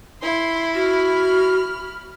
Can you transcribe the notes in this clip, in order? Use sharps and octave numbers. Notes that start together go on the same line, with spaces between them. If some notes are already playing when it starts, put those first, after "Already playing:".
E4 C6
F#4 B5 F6